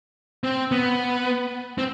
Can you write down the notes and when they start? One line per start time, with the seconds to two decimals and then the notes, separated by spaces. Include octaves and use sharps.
0.44 C4
0.71 B3
1.78 C4